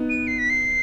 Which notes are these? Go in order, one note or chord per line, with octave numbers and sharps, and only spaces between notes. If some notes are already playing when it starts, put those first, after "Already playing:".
Already playing: B3 D#4
D#7
C7
B6
C7